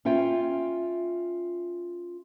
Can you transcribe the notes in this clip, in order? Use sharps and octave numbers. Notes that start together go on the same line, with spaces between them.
C#4 F4 E5 G5